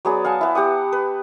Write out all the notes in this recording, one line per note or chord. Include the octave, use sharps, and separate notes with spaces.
F#3 B3 G#4 D5
F5 F#5 G#5 A5
B3 E4
B3 G4 F#5 D#6
B4